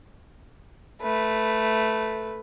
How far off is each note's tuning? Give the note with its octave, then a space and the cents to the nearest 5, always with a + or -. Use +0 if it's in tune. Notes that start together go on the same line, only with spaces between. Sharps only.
A3 +0 B4 +0